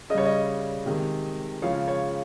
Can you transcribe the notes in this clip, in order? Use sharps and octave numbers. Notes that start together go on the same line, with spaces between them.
C#3 G3 C#5 D#5
D#5
C3 D#3 G#3
C#3 F3 G#3 C#5 F5
C#5